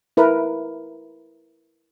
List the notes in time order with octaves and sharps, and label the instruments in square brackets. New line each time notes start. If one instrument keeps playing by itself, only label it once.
[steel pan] E4 A#4 B4